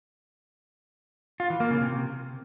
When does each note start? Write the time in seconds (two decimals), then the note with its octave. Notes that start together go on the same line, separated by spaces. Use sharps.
1.40 F4
1.50 E3
1.60 A#3
1.70 C#3
1.81 C3